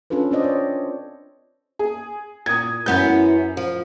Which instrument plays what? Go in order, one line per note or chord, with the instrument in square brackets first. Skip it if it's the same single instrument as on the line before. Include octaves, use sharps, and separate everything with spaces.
[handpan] C#4 D4 F4 A4 B4
C4 D4 C5 D5 D#5
C#5
[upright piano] G#4
[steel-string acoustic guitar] A#2 [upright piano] D#6 G#6
[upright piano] F#2 G6 [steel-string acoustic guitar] E3 B3 C#4
[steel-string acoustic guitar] F3